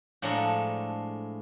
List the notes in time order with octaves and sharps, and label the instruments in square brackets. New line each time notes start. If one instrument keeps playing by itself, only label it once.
[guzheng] A2 F3 G#3 D4 A4 A#5